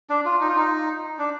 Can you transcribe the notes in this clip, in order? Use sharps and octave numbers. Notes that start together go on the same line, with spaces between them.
D4
F4
D#4
F4
D#4
D4